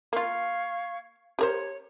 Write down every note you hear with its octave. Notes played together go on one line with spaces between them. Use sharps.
A#3 F4 F5 C#6 G#6
G4 A#4 C5 C#5